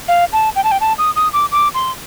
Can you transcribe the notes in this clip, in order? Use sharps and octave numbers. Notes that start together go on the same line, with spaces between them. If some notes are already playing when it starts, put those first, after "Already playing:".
F5
A5
G5
A5
G5
A5
D#6
D#6
D6
D6
C6